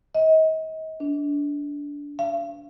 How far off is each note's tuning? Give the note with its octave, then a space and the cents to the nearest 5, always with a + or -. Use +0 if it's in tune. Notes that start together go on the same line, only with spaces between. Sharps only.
D#5 +35
D4 -20
F5 -40